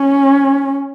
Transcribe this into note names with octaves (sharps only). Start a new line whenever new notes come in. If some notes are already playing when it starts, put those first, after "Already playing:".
Already playing: C#4